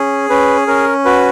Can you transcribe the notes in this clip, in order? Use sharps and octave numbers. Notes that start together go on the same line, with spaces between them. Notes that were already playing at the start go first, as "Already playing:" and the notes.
Already playing: C#4 G#4
C#4 B4
C#4 A#4
F#4 B4